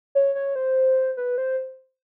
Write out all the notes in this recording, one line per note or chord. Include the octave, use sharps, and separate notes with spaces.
C#5
C#5
C5
B4
C5